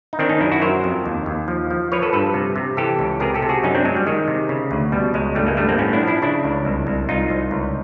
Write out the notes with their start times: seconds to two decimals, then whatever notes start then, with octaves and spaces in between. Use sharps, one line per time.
0.13 D#4
0.19 D#3 C4 D4
0.29 C#4 D#4
0.40 F#2 D4 E4
0.52 E4 F#4
0.62 F#3 A#4 C5
0.84 F2
1.06 D#2
1.26 D#2
1.48 F3
1.71 F3
1.92 F3 B4 C#5
2.02 A4 B4
2.13 G2 A4 B4
2.34 C3
2.56 C3
2.77 E3 G4 A4
2.99 C#2
3.20 C3 G#4 A#4
3.34 G4 A4
3.42 C3
3.49 F#4 G#4
3.63 F#2 C#4 D#4
3.75 C4 D4
3.85 F#3 G#3
3.97 G3
4.07 D#3 G#3
4.28 C3
4.49 C#3
4.71 D2
4.92 B2 G3
5.14 C#2 G#3
5.35 G2 G3 A3
5.47 G#3 A#3
5.57 G2 G3 A3
5.68 A#3 C4
5.78 A2 B3 C#4
5.93 D4 E4
6.01 F3
6.08 D4 E4
6.22 C#3 D4 E4
6.44 C#2
6.65 C2
6.87 C2
7.09 C2 D#4 F4
7.30 C2
7.51 C#2